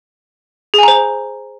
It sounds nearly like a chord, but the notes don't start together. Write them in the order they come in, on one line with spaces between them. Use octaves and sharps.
G#4 G#5 A#5 C5